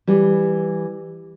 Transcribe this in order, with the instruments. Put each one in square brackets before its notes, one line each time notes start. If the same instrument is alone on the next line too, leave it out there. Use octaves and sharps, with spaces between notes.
[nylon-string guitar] E3 G3